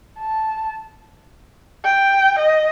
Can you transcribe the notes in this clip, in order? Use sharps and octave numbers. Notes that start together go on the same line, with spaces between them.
A5
G5
D#5